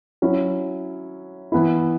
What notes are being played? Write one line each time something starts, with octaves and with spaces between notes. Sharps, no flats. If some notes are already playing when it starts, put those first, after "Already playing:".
F#3 C#4 E4
E3 B3 E4